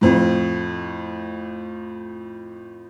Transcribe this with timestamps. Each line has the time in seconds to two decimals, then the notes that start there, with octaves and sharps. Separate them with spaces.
0.01 F2 A2